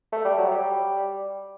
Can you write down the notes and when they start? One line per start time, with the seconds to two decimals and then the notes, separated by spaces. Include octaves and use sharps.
0.12 A3
0.25 G3
0.38 F#3
0.51 G3